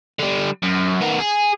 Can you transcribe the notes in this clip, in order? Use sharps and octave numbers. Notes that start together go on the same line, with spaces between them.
D3 G3
F#2
D#3 B3
G#4